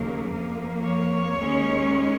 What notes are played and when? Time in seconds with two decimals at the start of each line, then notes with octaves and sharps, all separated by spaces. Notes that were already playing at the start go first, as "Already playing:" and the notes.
Already playing: D#2 C#3 F#3 A#3
0.28 F2 F3 A#3
0.82 C#5
1.36 D#2 D#3 G#3 C#4